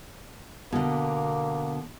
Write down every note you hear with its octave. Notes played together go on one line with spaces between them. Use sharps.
B2 D3 A#3